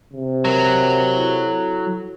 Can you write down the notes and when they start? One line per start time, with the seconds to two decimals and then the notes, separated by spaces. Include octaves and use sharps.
0.14 C3
0.45 F#3 A#4
1.14 E4 F#4 A4